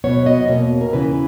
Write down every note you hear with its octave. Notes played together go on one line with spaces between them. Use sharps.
B2 F#3 B3 C#5
D#5
E2 B2 A#3 C#5
A#4
E2 C#3 E3 B4